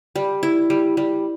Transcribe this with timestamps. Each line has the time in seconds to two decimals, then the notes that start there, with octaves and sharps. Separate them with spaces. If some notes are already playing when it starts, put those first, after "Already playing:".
0.16 G3
0.43 E4
0.70 G3
0.97 G3